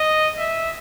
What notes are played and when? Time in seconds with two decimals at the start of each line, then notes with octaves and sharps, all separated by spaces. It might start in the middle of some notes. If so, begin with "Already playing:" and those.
Already playing: D#5
0.38 E5